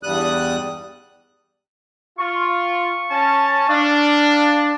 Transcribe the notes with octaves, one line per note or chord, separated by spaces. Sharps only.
E2 G2 G3 D#6 F#6
F4 C#6
C#4 A5
D4 F5